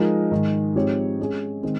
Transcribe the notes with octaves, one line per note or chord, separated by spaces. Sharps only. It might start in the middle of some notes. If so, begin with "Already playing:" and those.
Already playing: F3 G#3 D#4 A#4
G#2 D#3 G#3
G#2 F3 C4 G4 C#5
G#3 C#4 G#4 C#5
D#3 G#3 C4